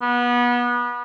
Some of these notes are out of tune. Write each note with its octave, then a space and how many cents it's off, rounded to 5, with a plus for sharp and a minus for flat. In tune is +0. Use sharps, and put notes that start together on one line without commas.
B3 -25